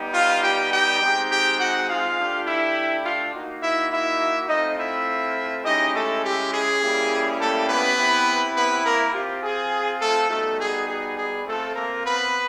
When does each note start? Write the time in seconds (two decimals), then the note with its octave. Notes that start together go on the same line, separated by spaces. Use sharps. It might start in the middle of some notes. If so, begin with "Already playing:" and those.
Already playing: G3 B3 D#4 G4
0.13 F4 F5
0.43 G4 G5
0.71 G4 G5
1.01 G#3 C4 D#4 G4
1.29 G4 G5
1.58 F#4 F#5
1.87 F4 F5
2.17 A3 D4 G4
2.45 E4 E5
3.04 F4 F5
3.33 A#3 D#4 F#4
3.61 E4 E5
3.90 E4 E5
4.48 A3 C4 D#4 F4 D#5
4.78 E4 E5
5.64 G#3 C#4 D#4 E4 G4 D#5
5.94 A3 A4
6.22 G4
6.52 G#4
6.80 G3 A#3 C#4 E4 G4
7.39 A3 A4
7.68 B3 B4
7.97 C4 E4 G4
8.55 B3 B4
8.83 A#3 A#4
9.13 C4 F4 G4
9.41 G#4
9.99 A3 A4
10.29 G3 A3 B3 D#4 F#4 A4
10.58 G#4
10.87 G#4
11.15 G#4
11.44 A3 C4 F4 A4
11.74 A#3 A#4
12.03 B3 B4